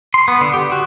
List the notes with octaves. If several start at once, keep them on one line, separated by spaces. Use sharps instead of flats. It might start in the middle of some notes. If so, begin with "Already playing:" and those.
C6
B3
D3
G4
F#4